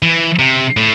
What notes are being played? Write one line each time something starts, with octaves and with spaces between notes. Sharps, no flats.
E3
C3
A2